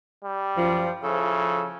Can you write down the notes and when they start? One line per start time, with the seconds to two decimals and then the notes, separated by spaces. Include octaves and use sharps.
0.24 G3
0.57 F#2 F3
1.03 C#3 F3 E4 A4